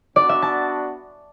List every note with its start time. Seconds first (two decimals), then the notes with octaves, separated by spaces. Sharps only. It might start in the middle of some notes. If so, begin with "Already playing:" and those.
0.16 B3 D4 F#4 D5
0.29 E5
0.42 A5